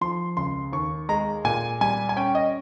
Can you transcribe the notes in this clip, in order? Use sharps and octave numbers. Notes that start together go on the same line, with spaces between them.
F3 C6
C#2 C6
D#2 C#6
G#3 A#5
A#2 G#5
G3 G#5
G#5
C#4 G5
D#5